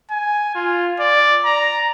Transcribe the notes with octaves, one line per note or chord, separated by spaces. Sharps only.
G#5
F4
D5
A#5